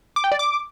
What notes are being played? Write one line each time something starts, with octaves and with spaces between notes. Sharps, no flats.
D6
G5
D5
D6